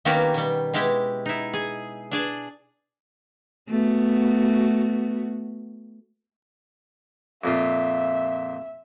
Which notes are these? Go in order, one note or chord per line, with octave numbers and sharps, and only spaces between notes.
D#3 A#3 B3 C#4 F#4 G4
B2 G3
B2 G#3 E4 G4
D#4 E4
G#4
D4 G#4 D5
A3 B3 F#4
F2 A#2 F4 E5